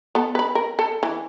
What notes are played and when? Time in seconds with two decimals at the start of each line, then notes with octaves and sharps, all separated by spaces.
0.15 B3 A4
0.35 B4 B5
0.55 A#4
0.79 A4
1.03 E3